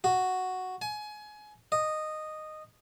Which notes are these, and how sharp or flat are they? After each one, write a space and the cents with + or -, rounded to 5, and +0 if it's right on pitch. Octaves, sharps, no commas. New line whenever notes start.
F#4 +0
G#5 +25
D#5 -10